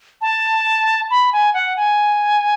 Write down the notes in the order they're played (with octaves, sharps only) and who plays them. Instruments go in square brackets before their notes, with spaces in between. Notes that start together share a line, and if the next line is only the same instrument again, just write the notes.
[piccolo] A5
B5
G#5
F#5
G#5